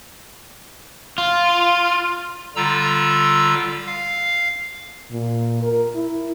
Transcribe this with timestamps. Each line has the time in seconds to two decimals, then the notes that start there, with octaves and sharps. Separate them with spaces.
1.18 F4
2.56 D3 G3 F4 A#5 E6
3.86 F5
5.11 A#2
5.62 A#4
5.95 E4